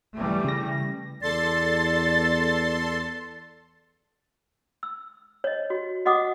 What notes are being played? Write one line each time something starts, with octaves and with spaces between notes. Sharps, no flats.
E3 G3 A3
C#3 A#6
E2 A4 D5 C6 A6
E6
C#5 D#5
F#4
F#4 D#5 F#5 D6 D#6